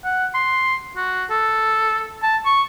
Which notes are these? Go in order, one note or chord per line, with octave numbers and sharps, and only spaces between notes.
F#5
C6
F#4
A4
A5
C#6